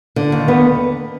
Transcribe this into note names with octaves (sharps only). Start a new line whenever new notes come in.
D3
D#2
B3